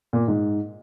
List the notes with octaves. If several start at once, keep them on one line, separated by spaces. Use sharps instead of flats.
A#2
G#2